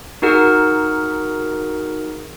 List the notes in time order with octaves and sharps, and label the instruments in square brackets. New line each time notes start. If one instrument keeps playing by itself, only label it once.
[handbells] D#4 F#4 G#4 A#4 F#5